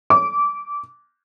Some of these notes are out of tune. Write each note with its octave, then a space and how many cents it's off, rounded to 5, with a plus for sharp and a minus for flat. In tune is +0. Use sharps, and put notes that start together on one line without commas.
D6 -20